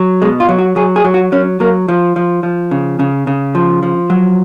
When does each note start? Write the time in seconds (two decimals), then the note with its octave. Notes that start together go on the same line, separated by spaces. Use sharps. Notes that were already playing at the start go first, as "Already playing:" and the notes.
Already playing: F#3
0.22 B2 G#3
0.40 F4
0.49 F#3
0.58 F#4
0.76 F#3 G#4
0.96 G#4
1.04 F#3
1.14 F#4
1.32 F#3 C#4
1.60 F#3 A#3
1.88 F3
2.16 F3
2.43 F3
2.71 C#3
2.99 C#3
3.27 C#3
3.55 F3
3.83 F3
4.10 F#3